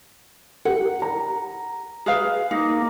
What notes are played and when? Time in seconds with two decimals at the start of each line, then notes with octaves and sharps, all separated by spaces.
0.65 G4 A#4 F#5
1.02 A#5
2.06 G#4 B4 F5
2.51 A#3 D#4